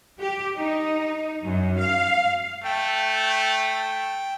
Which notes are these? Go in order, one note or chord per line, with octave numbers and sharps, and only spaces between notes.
G4
D#4
F#2
F5
A3 G5